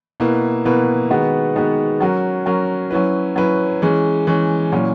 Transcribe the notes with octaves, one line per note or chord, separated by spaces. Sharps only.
B2 A#3 E4 B4
B2 A#3 E4 B4
D#3 G#3 B3 F#4 B4
D#3 G#3 B3 F#4 B4
F#3 C#4 F#4 A#4
F#3 C#4 F#4 A#4
F#3 C#4 E4 B4
F#3 C#4 E4 B4
E3 G#3 C#4
E3 G#3 C#4
A#2 F#3 C#4 E4